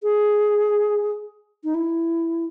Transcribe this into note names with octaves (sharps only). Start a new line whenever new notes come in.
G#4
D#4
E4